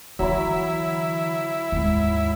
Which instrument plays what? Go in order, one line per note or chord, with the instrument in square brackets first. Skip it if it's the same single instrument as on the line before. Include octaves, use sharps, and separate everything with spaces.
[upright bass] D3 E3 [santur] F#3 B5 [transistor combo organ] E4
[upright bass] D#2 G#2